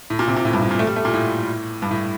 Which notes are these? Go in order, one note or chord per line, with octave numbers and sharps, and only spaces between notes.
A2
A#2
C3
A#2
A2
G2
A2
A#2
A3
G3
A3
A#2
A2
G2
A2